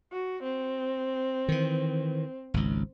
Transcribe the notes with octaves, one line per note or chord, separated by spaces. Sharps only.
F#4
C4
D#3 E3
G#1 C#2